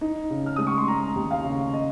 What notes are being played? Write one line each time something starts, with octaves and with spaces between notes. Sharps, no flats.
D#4
C#3
F6
G#3 D#6
C#6
C6
G#3 A#5
D#2
F5
C#3
D#5